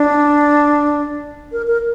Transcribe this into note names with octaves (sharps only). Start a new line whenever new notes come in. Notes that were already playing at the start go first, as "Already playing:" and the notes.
Already playing: D4
A#4
A#4